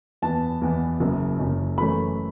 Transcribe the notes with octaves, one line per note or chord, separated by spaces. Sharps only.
E2 E3 B3 A5
E2 E3 B3
F#1 F#2 C#3
F#1 F#2 C#3
F#2 E3 A3 C#4 B5